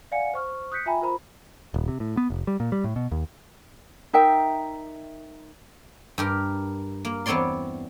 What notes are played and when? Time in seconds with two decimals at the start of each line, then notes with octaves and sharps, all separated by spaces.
0.12 D5 F5 F#5 G#5 C#7
0.34 C5 C#6 F6
0.72 D#6 F#6 G6 B6 C#7
0.86 F4 E5 G5 G#5 A#5 B5
1.01 F4 A#4 C5 A#5 B5
1.74 D#1
1.88 C3
2.00 A2
2.17 B3
2.30 F1
2.47 G3
2.60 A#2
2.72 G3
2.84 A2
2.96 B2
3.11 D#2
4.13 D#4 A#4 E5 G5
6.18 G2 G4 A#4
7.05 A#3
7.26 E2 B3 C4 C#5 D5 C6